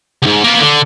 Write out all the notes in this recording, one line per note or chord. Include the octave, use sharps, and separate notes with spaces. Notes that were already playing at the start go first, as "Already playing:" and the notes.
C#2 G#2
A#3 B3
D3